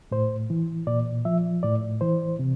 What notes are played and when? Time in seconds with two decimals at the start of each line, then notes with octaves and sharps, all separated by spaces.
0.11 A2 C5
0.50 E3
0.87 A#2 D5
1.25 F3 E5
1.63 A2 D5
2.01 E3 C5
2.39 C3